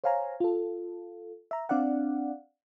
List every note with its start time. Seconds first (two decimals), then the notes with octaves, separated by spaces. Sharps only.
0.04 C5 C#5 F5 G#5 A#5
0.40 F4 A4
1.51 E5 A#5
1.69 C4 D4 D5 F5 F#5